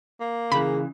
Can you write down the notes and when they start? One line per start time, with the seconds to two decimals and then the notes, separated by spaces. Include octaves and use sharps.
0.21 A#3
0.52 C#3 E3 G#4 B5